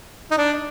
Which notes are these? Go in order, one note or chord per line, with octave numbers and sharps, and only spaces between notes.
D#4
D4